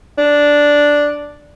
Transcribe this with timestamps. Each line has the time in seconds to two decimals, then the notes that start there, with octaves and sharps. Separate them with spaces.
0.18 D4